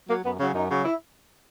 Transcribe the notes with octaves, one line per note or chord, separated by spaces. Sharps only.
F#3 A#3
F#2 B3
C#3 F#3 C#4
F#2 D#4
C#3 F#3
E4